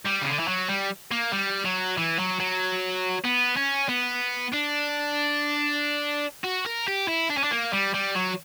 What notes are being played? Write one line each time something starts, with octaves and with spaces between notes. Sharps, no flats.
G3
C#3
D3
E3
F#3
G3
A#3
G3
F#3
E3
F#3
F#3
B3
C#4
B3
D4
F#4
A#4
G4
E4
D4
C#4
D4
A#3
G3
G3
F#3